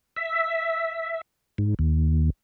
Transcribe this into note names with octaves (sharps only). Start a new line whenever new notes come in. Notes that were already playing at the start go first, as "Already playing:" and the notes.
E5
G#2
D#2